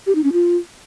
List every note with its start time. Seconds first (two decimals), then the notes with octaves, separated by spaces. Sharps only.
0.07 G4
0.15 D#4
0.24 C#4
0.33 F4